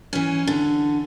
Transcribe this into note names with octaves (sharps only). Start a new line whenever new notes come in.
E3 C#4
D3